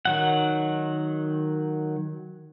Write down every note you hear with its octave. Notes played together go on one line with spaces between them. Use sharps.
D#3 F#3 F#5